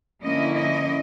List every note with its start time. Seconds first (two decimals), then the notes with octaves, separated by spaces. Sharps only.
0.23 D3 F3 A#3 C#4 E4 D#5
0.56 D#5